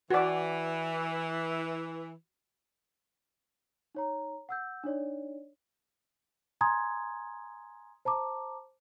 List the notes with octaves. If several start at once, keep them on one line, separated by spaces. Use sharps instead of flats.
E3 F#4 D5
D#4 C#5 A#5
F#5 E6 G6
D4 D#4 C#5 D5
G#5 A#5 C6 D#6 G#6
C5 A5 A#5 D6